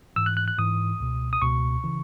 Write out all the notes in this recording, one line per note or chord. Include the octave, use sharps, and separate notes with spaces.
G#2 E3 E6
F#6
F#6
F#6
G#2 E3 D#6
C#2 B2
D#6
C#2 B2 C#6
C#3 E3